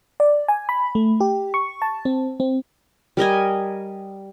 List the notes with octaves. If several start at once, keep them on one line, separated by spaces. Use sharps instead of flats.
D5
G#5
B5
A3
G4
C#6
A5
C4
C4
G3 A#4 D#5 G#5